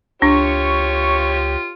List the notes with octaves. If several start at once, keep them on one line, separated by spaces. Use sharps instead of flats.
C#2 D4 F4 G4 C#5 C#6